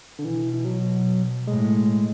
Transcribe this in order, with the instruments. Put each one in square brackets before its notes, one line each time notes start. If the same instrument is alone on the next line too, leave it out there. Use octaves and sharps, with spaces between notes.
[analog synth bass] D3
[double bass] B2 [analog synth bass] E3
[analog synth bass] E3
F#3
[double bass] A2 [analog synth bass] G#3